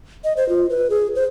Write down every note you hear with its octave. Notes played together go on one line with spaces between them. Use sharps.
D#5
C5
F4
B4
G#4
C5